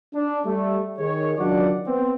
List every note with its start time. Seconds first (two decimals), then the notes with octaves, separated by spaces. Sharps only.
0.13 D4
0.45 G3 A3
0.98 D#3 G#4 C#5
1.38 C#2 D#3 F#3 D4 D5 F#5
1.87 B3 C4